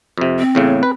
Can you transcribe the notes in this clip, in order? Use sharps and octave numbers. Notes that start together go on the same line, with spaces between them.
F2 C3
C4
E2 A2 C#3
B4